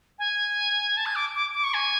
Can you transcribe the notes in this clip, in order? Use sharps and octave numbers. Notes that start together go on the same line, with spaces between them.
G#5
A5
G#6
D6
D6
D6
C#6
G#5